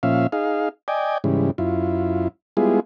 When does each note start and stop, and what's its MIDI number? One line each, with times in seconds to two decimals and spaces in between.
0.03 0.27 46
0.03 0.27 53
0.03 0.27 61
0.03 0.27 76
0.03 0.27 77
0.32 0.69 63
0.32 0.69 68
0.32 0.69 77
0.88 1.18 74
0.88 1.18 75
0.88 1.18 79
0.88 1.18 80
1.24 1.51 44
1.24 1.51 49
1.24 1.51 52
1.24 1.51 55
1.58 2.28 42
1.58 2.28 64
1.58 2.28 65
2.57 2.80 55
2.57 2.80 56
2.57 2.80 59
2.57 2.80 64
2.57 2.80 65
2.57 2.80 68